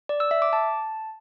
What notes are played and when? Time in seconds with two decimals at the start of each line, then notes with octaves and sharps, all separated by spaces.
0.09 D5
0.20 E6
0.31 E5
0.42 D6
0.53 A5